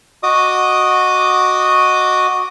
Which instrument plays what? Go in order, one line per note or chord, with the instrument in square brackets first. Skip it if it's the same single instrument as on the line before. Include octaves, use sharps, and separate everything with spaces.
[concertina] F#4 D#5 D6 D#6